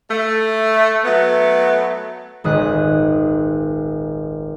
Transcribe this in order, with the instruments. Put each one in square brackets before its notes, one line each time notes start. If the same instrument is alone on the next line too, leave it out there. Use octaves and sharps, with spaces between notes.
[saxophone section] A3
F#3 A3 B3
[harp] D#1 G#1 D#6 F#6